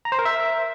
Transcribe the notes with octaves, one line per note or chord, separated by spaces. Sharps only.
A#5
C5
A#4
E5